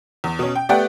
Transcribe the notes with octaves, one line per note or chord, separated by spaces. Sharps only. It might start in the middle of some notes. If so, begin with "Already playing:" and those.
E2
B2 C#4
G5
A3 B3 G4 D5 F#5 G5